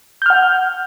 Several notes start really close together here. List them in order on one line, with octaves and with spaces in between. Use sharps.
G6 F6 F#5